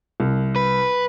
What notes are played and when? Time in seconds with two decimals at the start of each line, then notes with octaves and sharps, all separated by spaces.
0.20 C2
0.56 B4